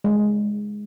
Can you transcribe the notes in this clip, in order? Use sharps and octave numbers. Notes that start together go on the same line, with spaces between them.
G#3